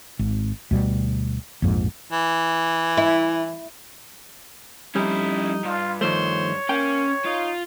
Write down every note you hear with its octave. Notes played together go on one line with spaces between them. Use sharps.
G#1
D2 B2 G3
A#1 F2 G#2
E3
E4
F2 G3 C#4 D#4 E4
G2 F4
D#3 F3 A3 C5 C#5
A#3 C#4 G5
D#4 F4